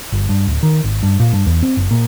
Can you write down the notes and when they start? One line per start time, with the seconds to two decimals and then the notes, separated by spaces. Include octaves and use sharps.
0.12 G1
0.29 G2
0.47 D1
0.63 D#3
0.84 G#1
1.03 G2
1.20 A#2
1.33 G2
1.47 E2
1.63 C4
1.77 F#1
1.91 A#2